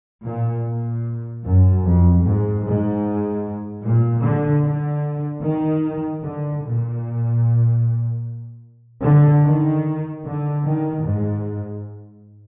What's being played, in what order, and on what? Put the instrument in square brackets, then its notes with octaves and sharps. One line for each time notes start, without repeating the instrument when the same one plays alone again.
[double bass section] A#2
A#2
F#2
F2
G#2
G#2
A#2
D3
D3
D#3
D3
A#2
D3
D#3
D3
D#3
G#2